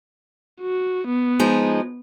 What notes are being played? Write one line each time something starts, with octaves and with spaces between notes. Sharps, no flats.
F#4
B3
F3 G#3 D#4